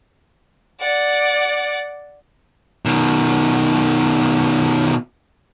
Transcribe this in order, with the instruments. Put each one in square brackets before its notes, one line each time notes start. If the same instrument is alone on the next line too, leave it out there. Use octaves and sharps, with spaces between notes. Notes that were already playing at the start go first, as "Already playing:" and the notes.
[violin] D5 F#5
[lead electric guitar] B2 D#3